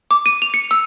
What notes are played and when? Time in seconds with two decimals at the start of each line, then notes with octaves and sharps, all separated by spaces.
0.11 D6
0.26 D#7
0.42 F7
0.54 C#7
0.71 E6